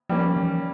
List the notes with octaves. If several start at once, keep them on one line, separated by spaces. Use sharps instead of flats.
F3 G3 A#3 C#4
E3